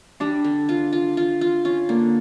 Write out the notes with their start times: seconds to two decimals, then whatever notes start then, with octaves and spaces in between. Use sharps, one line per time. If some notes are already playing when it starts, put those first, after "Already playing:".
0.20 G3 D4
0.44 D3
0.69 F4
0.93 F4
1.17 F4
1.41 F4
1.65 C#4 F4
1.89 D3 A#3